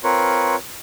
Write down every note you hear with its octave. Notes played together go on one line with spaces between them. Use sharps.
C4 F4 A#4 B4 C#5